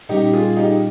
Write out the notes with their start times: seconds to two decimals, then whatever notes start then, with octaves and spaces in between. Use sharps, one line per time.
0.09 A#2 G3 C#4 D#4 G4
0.33 F4 G#4
0.57 D#4 G4